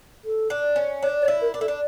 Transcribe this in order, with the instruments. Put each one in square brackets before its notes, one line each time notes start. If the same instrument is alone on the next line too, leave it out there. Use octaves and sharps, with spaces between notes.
[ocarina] A4
[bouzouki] D4
C#4
[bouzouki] D4 [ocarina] C#5
[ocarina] C#5
[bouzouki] E4
[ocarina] A#4
[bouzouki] D4
[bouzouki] E4 [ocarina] A4
[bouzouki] D4